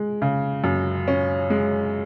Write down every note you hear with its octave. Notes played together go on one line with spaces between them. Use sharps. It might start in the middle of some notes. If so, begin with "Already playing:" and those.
Already playing: G#3
C#3
F#2
C#4
G#3